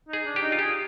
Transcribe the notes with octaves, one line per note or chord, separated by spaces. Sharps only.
D#4
G#4
D4
G4
D#4
F4
G4 G#4